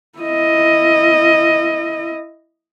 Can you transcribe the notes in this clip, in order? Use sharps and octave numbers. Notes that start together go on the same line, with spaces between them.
E4 D#5